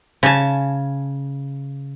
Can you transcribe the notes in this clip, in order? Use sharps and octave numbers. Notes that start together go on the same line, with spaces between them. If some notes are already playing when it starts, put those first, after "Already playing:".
C#3 G#5 A5